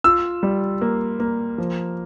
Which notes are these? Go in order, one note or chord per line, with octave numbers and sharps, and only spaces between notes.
F4 E6
G3
A#3
A#3
F3